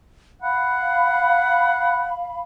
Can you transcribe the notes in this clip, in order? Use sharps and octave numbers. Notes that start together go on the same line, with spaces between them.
F5 F#5 B5